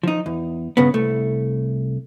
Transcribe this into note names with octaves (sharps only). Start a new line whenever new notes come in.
F3 D#4
E2
G2 C#3 B3
C2 A3